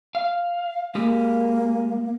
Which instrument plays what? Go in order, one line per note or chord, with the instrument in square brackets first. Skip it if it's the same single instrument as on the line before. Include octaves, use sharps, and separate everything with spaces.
[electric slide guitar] F5
[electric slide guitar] G#3 G4 G#4 [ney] A#3